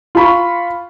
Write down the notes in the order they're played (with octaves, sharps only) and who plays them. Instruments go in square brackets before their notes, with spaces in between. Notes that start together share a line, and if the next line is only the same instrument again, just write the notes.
[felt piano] F4 B5 C#6